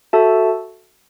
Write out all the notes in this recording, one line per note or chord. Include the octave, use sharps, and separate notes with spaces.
F#4 A4 E5 A5